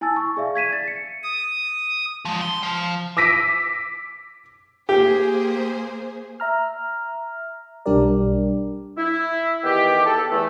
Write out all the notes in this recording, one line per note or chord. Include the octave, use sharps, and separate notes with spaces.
E4 G#5 A5 E6 A6
C#6
G#4 D5 E5 F5
G#6 B6 D#7 E7
A6
C#7
D#6
F3 G#3
C6
F3
D6 E6 A#6 B6 D7 D#7
A#3 G4 G#4 C5
E5 A#5 F6
B1 G3 D4 G4 A#4 D5
E4
E2 D#3 B3 G4
A4
E2 A3